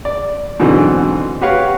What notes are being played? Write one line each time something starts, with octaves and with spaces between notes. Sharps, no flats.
D5
G#2 B2 D3 E3 F#3 C4
F#4 G4 B4 C#5 F5 F#5